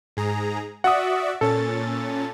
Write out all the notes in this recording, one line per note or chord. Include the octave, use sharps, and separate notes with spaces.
G#2 G#4 A#5
F#4 D5 E5 F#5 D#6
A#2 C#4 A4 A6